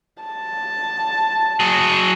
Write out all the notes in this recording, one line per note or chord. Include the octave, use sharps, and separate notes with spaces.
A5
F#3 G#4